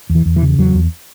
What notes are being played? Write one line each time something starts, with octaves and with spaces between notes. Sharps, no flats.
E2
E3
E2
E3
C#3
E2 F#3
E2